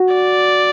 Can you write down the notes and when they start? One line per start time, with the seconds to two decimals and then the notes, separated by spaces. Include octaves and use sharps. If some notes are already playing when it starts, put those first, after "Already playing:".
Already playing: F#4
0.14 D5